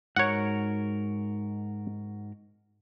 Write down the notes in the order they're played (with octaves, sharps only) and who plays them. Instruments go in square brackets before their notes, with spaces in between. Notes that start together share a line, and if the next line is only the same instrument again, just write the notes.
[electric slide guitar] G#2 F#4 A#4 [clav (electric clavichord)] C#5 F#5